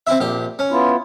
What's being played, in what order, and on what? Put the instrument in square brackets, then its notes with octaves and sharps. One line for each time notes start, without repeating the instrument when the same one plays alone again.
[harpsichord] C4 E4 E5
A#1 G4
C#4
[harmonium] B3 E4 F4